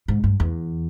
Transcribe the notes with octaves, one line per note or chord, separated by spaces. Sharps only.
G#2
G2
E2